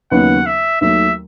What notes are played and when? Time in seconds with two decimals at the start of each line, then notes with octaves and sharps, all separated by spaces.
0.11 D#2 C#3 F#3 B3 D#4 F#5
0.46 E5
0.81 D#2 D#3 F#3 A3 E5